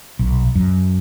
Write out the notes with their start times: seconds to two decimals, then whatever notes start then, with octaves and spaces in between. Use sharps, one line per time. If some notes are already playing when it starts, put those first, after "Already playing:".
0.19 B1
0.55 F#2